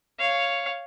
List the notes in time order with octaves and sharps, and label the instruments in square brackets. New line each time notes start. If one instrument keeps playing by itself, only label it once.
[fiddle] C#5 F5